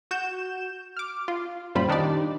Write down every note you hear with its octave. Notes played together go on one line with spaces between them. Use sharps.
F#4 G6 E7
D6 F6
F4
F#2 A#2 G3 F4 C5 B5
D#3 D4 D#4 G4 D5